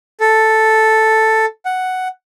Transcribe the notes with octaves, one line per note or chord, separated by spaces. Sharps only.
A4
F#5